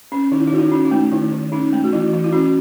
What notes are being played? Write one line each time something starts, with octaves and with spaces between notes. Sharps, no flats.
C#4
D#3 D#4
E4
D#4
D#3 F#4
E4
C#4
D#4
A3
D#3 E4
D#3
C#4 D#4
A3
F#4
E3 E4
E3
E4
C#4 F#4